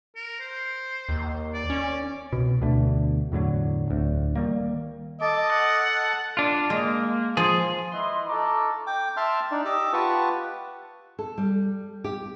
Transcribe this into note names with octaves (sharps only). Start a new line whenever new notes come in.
A#4
C5
D#2
D5
C#4
C2 B2
D2 B2 D3 A3
E2 A2 D3 F#3
D1 D2
D#3 G3 A#3
A4 D#5 A5 D6
F#5
D4 F4
G#3 A#3
F3 G#4
E4 B4 D#5 C6
D#4 F4 A4 A#5 C#6 D6
G5 D6
E5 A5 C6 F6
D4 D#4 D5
G4 D#5 D6 E6
F4 G4 B4 F#5 A5 C#6
A4
G3
G4